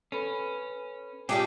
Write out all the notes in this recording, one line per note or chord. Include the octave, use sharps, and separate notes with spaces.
C#4 A4 B4 B5
A2 G3 A3 C#4 F4 G4 G#4 G5